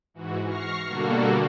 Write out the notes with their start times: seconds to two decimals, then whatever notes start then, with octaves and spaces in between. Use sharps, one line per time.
0.14 G#2 E3 F#4
0.45 C#6 F6 A#6 C7
0.87 B2 D3 G3 A#3 F#4 A4